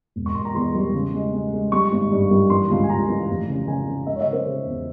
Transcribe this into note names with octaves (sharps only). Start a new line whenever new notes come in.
E1
C#6
E1 C6
A#5
E2 C6
G3
C#3
G#3
G#3
G#3
G3 C#6
G#1
G2
G3
E3 C6
C#2
G#5
C#2 A#5
E3
F1
C#3
C#3 G#5
C#3
G#3 E5
C#5
E5
C#3
C5
C#3 G#4
E2